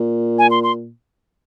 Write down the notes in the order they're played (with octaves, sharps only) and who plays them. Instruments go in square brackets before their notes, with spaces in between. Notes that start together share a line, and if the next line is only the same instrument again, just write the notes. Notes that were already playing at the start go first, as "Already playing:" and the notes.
Already playing: [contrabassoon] A#2
[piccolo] G#5
C6
C6